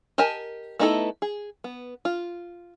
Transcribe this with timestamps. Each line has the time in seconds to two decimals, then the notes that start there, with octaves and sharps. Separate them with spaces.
0.18 G4 A#4 D#5 G#5 A5
0.79 A3 B3 D#4 E4 A4
1.22 G#4
1.64 B3
2.05 F4